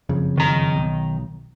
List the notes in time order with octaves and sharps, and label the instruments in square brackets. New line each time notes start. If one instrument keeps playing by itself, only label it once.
[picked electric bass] F#1 F2 C#3
[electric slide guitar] D#3 A#5
[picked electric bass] B1